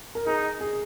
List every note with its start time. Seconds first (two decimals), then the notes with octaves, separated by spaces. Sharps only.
0.15 A#4
0.26 D#4 G#4
0.61 G#4